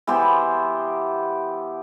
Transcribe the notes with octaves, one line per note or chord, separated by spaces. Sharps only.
E3 B3 G4 C5